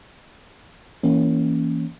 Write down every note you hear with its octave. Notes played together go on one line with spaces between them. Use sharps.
E3 A#3 C#4